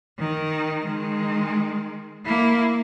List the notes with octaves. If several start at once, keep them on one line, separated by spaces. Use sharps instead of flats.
D#3
D#3 G#3
A#3 E4